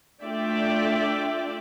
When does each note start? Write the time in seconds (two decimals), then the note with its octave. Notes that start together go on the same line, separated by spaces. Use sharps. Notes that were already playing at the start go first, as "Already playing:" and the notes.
0.23 A3 D4 F4 D5 E5 G5